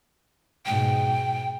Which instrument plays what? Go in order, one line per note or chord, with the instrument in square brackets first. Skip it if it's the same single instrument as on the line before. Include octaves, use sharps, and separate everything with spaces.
[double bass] G#2 B2 [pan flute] G5